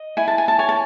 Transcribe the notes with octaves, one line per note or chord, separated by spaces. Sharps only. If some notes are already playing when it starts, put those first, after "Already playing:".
Already playing: D#5
E4 G#5
A5
G#5
A5
C#5 G#5
A5